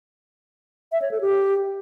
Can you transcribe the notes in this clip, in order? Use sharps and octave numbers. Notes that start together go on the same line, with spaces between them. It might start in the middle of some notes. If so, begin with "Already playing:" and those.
E5
C#5
A4
G4